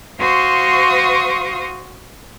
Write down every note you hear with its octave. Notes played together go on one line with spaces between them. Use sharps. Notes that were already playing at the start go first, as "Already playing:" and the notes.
F#4 C5 F5 C6 C#6 D#6